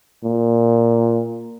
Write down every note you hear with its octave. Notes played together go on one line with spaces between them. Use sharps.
A#2